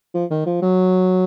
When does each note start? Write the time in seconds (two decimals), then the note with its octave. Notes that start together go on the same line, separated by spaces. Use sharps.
0.14 F3
0.30 D#3
0.46 F3
0.62 F#3